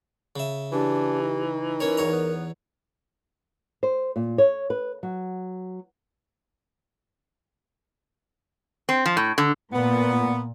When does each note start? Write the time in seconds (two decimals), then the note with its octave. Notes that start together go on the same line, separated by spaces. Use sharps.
0.36 C#3 E5
0.72 E3 D4 G4
1.23 D#4
1.80 C#4 A#4 C#5
1.97 E2 C#5 A#5
2.12 B3
3.83 C5
4.16 A#2
4.38 C#5
4.70 B4
5.03 F#3
8.89 C4
9.06 F3
9.17 A2
9.38 D3
9.73 A#2 B3